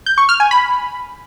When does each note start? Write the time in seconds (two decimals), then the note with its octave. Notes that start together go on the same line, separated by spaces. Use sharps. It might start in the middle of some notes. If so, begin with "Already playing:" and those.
0.06 G6
0.18 C#6
0.29 F6
0.40 G#5
0.51 B5